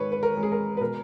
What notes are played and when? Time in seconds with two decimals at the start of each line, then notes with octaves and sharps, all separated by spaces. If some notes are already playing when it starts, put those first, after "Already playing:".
Already playing: G#2 D#3 G#3 B4 C#5
0.12 B4
0.23 A#4
0.37 G#3
0.43 G#4
0.52 A#4
0.77 B4
0.81 B2 A#4